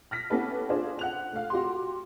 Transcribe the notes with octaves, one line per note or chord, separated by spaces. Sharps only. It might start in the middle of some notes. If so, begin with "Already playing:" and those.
F6 A#6 B6
B3 C#4 E4 G4 A4 B4
D4 F4 G#4 A4 C5
F#5 F#6 F7
A3 F5
F#4 G4 C6